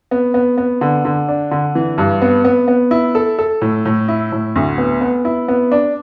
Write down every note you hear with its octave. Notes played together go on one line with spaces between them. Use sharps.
B3
B3
B3
D3
D3
D4
D3
E3
G2
B3
B3
B3
E4
A4
A4
A2
A2
E4
A2
D2
B3
B3
E4
B3
D4